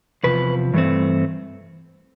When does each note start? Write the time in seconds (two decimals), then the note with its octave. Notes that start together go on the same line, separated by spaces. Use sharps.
0.23 E2 C3 F3 B4
0.74 G2 E3 A3 C4